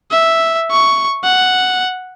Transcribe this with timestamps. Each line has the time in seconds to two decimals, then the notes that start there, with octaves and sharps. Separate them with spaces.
0.11 E5
0.71 C#6
1.24 F#5